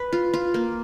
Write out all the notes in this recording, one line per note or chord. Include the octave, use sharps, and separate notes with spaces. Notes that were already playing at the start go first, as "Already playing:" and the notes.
Already playing: B4
F4
F4
A#3